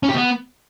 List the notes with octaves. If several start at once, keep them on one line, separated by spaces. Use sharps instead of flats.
C#4
G4
B3